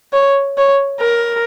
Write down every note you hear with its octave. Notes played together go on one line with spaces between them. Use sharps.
C#5
C#5
A#4